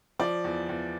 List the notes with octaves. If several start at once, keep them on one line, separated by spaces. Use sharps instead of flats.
F3 D5
E2
E2